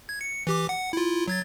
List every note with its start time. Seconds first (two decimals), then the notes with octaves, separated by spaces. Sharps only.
0.09 G#6
0.21 C#7
0.47 E3 G4 D6
0.69 F#5
0.93 E4 F4
1.28 F#3 G#6 A6